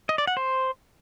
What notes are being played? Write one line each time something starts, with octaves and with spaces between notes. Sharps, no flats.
D#5
D5
F#5
C5